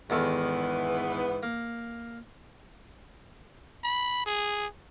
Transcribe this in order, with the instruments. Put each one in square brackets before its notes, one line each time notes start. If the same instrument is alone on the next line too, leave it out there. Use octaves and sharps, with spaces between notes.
[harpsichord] E2 D#3 A4 [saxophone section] G#2 E3 B3
[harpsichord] A#3
[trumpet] B5
G#4